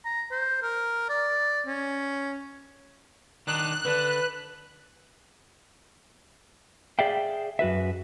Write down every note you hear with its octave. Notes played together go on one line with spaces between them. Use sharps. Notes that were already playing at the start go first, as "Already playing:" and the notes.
A#5
C5
A#4
D5
C#4
D#3 D4 D#4 F#6
D3 D4 B4
G#4 D5 E5 F5 G5
F#2 F#4 B4 E5